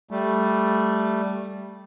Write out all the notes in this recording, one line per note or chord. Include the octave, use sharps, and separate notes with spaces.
G3 A3